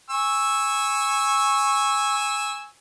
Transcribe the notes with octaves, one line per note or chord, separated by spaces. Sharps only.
G#5 C#6 E6